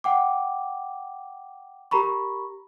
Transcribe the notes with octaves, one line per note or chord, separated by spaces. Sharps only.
F#5 G5 D6
G4 A#4 A#5 B5 C#6